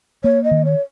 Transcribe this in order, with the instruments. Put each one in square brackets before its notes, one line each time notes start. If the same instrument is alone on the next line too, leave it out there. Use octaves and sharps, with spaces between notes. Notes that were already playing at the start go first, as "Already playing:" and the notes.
[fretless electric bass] A#3 [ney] C#5
[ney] D#5
[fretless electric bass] D#3
[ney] C#5